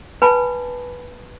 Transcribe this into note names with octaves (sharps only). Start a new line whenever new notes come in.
B4 G#5 A5 B5